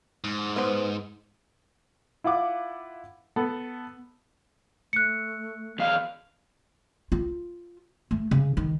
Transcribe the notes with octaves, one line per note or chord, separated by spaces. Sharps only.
G#2
B3 C5
E4 F4 F#5 D6
B3 A4
A3 F#6 C#7
E2 F5
F4
A3
C#3
D#3